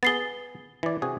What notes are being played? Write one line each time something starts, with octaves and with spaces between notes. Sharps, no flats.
B3 G#4 A6 C7 G7
E3 D5
C3 F#4 G#4